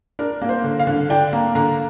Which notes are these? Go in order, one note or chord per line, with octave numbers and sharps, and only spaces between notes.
D4 A#4
A#3
C5
D3
F5
D3
D4 G5
A#3 A#5
D3 A#5